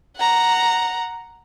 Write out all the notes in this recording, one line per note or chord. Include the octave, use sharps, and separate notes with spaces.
F#5 A#5